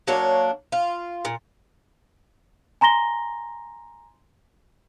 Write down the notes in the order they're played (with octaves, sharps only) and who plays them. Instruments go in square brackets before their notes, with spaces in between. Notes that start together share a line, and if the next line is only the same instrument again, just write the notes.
[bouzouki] F#3 A#3 D4 C#5
F4
A#2
[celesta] G#5 A#5 C6 A#6 G7